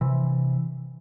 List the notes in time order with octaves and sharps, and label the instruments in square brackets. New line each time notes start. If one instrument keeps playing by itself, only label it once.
[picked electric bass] C3 E3